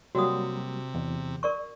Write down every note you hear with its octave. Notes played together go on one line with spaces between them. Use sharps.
C3 F#3 G3 A#3 F#4 D#6
E2
A#4 D5 C#6